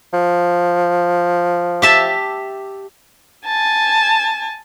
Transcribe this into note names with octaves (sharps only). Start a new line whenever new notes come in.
F3
G4 E5 A5
G#5 A5